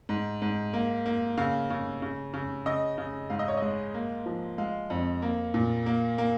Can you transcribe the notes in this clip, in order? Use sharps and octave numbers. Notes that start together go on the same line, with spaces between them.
G#2
G#2
A#3
A#3
C#3 F5
C#3
C#3
C#3
C#3 D#5
C#3
G#2 F5
D#5
C#5
G#3 D#5
A#3
F3
G#3 F5
F2
A#3
A#2
A#3
A#3